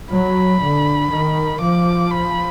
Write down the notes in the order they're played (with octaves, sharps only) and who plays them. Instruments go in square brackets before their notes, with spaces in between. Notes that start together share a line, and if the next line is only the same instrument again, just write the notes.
[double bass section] F#3 [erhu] B5
[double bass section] D3
D#3
[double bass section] F3 [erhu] D6
[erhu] B5